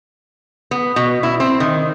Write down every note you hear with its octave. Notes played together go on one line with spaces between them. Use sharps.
B3
B2
E4
C4
D#3